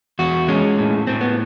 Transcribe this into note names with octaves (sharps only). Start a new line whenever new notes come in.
E2 F#4
G#3 C#4
A2
A2 C4
B3